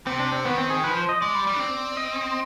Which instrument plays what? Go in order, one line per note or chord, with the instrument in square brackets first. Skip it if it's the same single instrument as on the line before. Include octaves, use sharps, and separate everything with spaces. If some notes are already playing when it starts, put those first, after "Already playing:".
[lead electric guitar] C3 [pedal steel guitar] C4
[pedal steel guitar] D4
C4
[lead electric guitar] D#3 [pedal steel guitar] B3
[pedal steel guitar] C4
G#4
[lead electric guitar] F3 [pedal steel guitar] B4
[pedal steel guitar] C5
D#5
[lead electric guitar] G#3 [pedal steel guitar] D5
[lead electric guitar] G3
G3
D4
C4
[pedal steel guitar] D#5